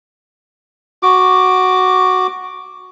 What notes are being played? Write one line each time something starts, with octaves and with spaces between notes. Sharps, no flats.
F#4 D6